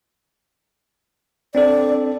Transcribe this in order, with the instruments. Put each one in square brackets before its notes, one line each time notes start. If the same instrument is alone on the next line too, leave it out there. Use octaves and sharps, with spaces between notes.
[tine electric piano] C4 D4 A4 [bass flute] D5